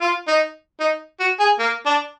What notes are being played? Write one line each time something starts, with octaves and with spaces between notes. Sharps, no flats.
F4
D#4
D#4
F#4
G#4
A#3
D4